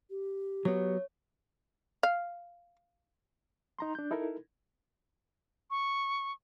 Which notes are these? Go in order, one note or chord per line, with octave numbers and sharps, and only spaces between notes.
G4
F#3 B3 C#5
F5
D#4 A#5 C6
D4 G6
D#4 E4 A4 A#4
C#6